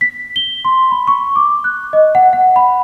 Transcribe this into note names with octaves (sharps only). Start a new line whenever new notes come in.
B6
G7
C6
B5
C#6
D6
F#6
D#5
F#5
F#5
B5